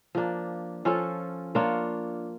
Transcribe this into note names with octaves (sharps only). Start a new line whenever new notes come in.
F3 A#3 D4
F3 C#4 F4 A4
A#3 D4 F4 C#5